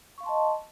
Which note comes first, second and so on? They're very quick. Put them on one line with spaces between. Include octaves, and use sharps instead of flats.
C#6 F5 C6 A5 D#5